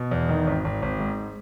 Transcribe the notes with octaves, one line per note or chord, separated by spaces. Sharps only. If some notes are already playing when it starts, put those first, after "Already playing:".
Already playing: B2
E2
D#3
G#1
G#1
G#1
G#2